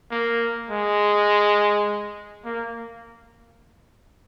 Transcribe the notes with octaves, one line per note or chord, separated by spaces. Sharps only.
A#3
G#3
A#3